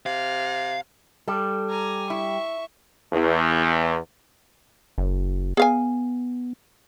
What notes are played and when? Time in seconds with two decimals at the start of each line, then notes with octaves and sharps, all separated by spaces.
0.06 C3 F5
1.28 G3 A4
1.70 G#5 A#5
2.10 E4 E5 C#6
3.13 E2
4.98 F#1
5.57 B3 G#4 F5 G#5